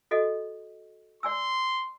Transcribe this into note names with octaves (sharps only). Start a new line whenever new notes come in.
F#4 A4 D#5
D5 G#5 C6 E6